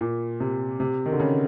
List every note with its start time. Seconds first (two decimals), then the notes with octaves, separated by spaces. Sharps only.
0.01 A#2
0.40 C3
0.80 C3
1.06 D#3
1.12 D3
1.20 C#3